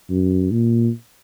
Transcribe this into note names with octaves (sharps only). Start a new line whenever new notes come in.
F#2
A#2